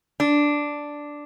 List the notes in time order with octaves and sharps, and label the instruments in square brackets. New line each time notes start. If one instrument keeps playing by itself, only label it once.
[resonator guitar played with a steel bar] D4